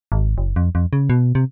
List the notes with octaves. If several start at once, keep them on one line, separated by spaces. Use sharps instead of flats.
G#1
F#1
F2
F2
C#3
B2
C3